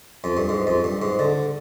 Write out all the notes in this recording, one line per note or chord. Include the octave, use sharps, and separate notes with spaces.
F2
G2
G#2
F2
G2
G#2
D3